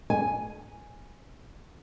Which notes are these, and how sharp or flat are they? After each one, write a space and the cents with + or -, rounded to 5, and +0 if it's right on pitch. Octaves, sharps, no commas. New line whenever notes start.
G#5 +0